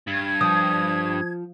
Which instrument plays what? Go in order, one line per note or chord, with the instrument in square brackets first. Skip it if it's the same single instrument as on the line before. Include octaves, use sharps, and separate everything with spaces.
[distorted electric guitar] G2 [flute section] G#6
[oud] F3 [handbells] D#6